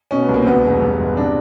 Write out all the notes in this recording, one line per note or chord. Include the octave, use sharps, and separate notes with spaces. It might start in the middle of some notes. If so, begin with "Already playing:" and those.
B2 C#4
B3
C2
A#3
C4
D2 B3
E1
G2
G1
C3 D4